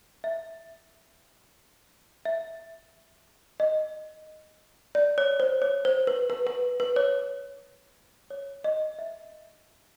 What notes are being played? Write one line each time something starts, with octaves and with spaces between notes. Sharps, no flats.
E5
E5
D#5
D5
C#5
C5
C#5
C5
B4
B4
B4
B4
C#5
C#5
D#5
E5